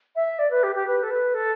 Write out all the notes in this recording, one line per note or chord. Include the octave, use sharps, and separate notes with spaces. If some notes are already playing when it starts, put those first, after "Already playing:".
E5
D5
B4
G4
G4
B4
A4
B4
A4